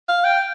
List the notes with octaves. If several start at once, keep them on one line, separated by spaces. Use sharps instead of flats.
F5
G5